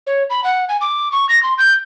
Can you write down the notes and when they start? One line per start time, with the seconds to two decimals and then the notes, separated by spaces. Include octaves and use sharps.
0.07 C#5
0.30 B5
0.44 F#5
0.69 G#5
0.81 D6
1.12 C#6
1.29 A#6
1.43 C6
1.58 G6